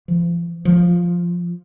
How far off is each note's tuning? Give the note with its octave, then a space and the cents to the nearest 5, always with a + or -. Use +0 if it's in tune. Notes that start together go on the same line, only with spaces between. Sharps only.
F3 -35
F3 +0